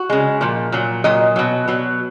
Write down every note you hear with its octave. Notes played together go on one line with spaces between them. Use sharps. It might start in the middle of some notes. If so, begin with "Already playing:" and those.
Already playing: F#4
C#3 G#3
A#2 F3
A#2 F#3
A#2 F#3 D#5
B2 F#3
B2 F#3